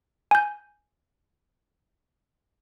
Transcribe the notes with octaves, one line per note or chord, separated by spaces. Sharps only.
G#5 G6